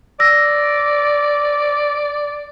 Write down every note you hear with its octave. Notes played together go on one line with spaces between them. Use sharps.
D5 E6 A#6